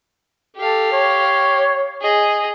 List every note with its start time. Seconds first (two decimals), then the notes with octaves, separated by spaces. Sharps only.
0.57 G4 A4 F5
0.93 C#5
2.01 G#4 D#5